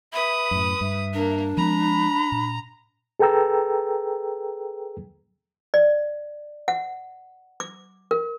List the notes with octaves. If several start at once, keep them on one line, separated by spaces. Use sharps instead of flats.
B4 E5 B5 D#6
F#2 A2
G2 E5
A#3 D4 A#4
F3 G#3 C4 A#5 B5
A#2
G#4 A4 B4 G5 A#5 E6
D5
F#5
D6
A#4